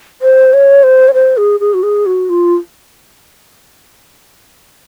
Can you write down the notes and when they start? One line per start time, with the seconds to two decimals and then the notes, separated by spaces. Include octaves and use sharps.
0.22 C5
0.53 C#5
0.83 C5
1.08 C#5
1.14 C5
1.37 G#4
1.60 G#4
1.74 F#4
1.83 G#4
2.06 F#4
2.29 F4